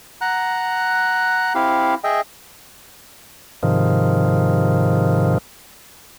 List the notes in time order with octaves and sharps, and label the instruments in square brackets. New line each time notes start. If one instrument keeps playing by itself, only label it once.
[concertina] F#5 A#5 F#6
C4 E4 G4 F5
G#4 D#5 E5 G5
[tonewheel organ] G#2 C3 D#3 F3